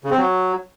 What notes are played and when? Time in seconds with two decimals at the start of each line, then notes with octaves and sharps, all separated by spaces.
0.04 C#3
0.11 C4
0.18 F#3